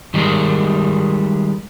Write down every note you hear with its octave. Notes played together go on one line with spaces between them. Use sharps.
D#3 G3 G#3 A#4